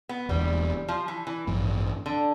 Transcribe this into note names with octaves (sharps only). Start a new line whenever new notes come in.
B3
E1 E2 D3 G3
F3
E3
E3
A1 G2 F3 A3
D3